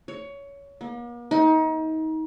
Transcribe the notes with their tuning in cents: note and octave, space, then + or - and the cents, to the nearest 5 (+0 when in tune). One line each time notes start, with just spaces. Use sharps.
C#5 +20
A#3 +45
D#4 +30